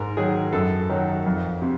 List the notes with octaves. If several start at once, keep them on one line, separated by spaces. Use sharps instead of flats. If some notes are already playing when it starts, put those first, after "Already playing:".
Already playing: G#2 A#4
D#3 F#3 G#4
F#2 A4
D#3 F#3
F2
C3